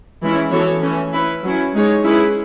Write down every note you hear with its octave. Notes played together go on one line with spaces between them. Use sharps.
E3 G#3 C#4 E4
E3 B3 F#4 A4 C#5
E3 A3 C#4
C#4 E4 B4
F#3 C#4 E4
G#3 D#4 G#4 C#5
G#3 C#4 E4 G#4 B4